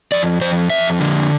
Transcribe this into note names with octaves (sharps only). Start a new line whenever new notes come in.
F2 D5
F2 C5
F2 E5
D3